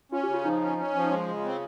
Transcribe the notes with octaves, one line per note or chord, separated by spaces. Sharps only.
C#4 F4
G4
C#3
F4
F3 D#4
C#4
C#4
F3
D#4
G#3 F4
C#3
C4